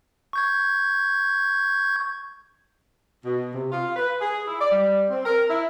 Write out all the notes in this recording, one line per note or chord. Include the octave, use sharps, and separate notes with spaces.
C#6 G6 G#6
B2
C3
F4
B4
G#4
E4
D5
G3
C4
A#4
E4